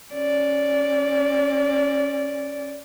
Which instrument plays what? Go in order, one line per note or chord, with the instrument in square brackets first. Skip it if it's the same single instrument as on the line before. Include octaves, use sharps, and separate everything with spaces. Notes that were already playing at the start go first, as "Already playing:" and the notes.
[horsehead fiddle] C#4 D5